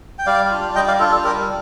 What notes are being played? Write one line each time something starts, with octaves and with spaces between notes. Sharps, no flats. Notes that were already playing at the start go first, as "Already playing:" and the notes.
G5
G3 D5 F5
D4 F4
G3 D#5 G5
D5 F5
D4 F4 A4
A4
G3 G4 A#4